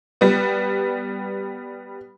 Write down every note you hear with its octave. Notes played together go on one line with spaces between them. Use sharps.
G3 B3